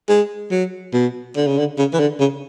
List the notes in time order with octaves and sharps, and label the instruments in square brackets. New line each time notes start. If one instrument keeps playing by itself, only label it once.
[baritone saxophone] G#3
F#3
B2
D3
C#3
D3
C#3
E3
D3
C#3